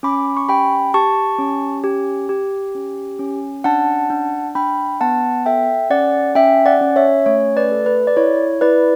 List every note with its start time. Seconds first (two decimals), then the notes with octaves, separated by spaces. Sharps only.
0.03 C#4 B5 D6
0.37 C#6
0.48 G4 G5 B5
0.94 G4 A5 C#6
1.39 C#4
1.84 G4
2.29 G4
2.75 C#4
3.19 C#4
3.64 D4 F#5 A5
4.10 D4
4.55 D4 G5 B5
5.01 B3 F#5 A5
5.46 A4 E5 G5
5.90 C#4 D5 F#5
6.35 C#4 E5 G5
6.66 D5 F#5
6.81 C#4
6.96 C#5 E5
7.26 A3 C#5
7.57 B4 D5
7.72 A4
7.86 B4
8.07 D5
8.16 E4 C#5
8.61 E4 B4 D5